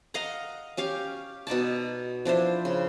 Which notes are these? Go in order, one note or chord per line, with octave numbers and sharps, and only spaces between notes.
D#5 F5 F#5 A#5
C#4 G4 F5 D6
B2 D#4 D5 A5
F3 D4 E4 C5
C#3